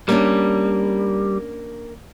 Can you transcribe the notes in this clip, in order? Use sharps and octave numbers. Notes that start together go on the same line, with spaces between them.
G3 A#3 C#4 D4